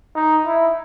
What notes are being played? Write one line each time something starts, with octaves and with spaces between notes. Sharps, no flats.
D#4
E4